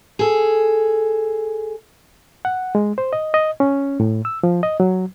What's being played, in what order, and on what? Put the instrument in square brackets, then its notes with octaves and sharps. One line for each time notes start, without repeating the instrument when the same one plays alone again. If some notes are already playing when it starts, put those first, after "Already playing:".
[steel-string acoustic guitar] G#4 A4
[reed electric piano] F#5
G#3
C5
D#5
D#5
C#4
A2
E6
F3
D#5
F#3